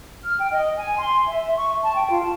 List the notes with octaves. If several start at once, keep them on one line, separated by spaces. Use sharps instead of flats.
F6
G5
D#5
G#5
C6
E5
C#6
A5
G5
F4
A5